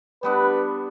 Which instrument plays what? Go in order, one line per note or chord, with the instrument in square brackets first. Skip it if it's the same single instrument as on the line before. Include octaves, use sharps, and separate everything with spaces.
[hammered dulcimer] G3 B3 D4 [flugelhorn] B4